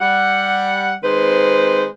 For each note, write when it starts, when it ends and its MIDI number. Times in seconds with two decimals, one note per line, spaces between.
0.01 0.95 55
0.01 0.95 78
1.03 1.86 51
1.03 1.86 56
1.03 1.86 60
1.03 1.86 71
1.03 1.86 72